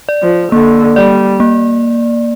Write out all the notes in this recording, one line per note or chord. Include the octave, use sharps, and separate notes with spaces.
D5
F3
D3 A#3
G3 D5
A#3